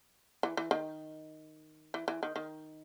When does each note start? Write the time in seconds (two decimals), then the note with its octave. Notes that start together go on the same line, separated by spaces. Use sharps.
0.43 E3
0.57 E3
0.71 D#3
1.94 E3
2.08 E3
2.23 D#3
2.36 D#3